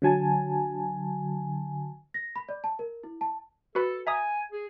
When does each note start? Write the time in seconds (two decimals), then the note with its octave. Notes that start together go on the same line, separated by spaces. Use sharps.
0.02 D3 F#3 G#5 A5
2.14 A#6
2.36 B5
2.49 D5
2.64 A5
2.79 A#4
3.03 E4
3.21 A5
3.75 F#4 A4 B4 B5
4.07 E5 G#5 A#5 D#6
4.52 G#4